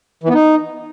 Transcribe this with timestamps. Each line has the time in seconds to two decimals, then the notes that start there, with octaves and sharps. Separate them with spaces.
0.24 E3
0.29 B3
0.34 D#4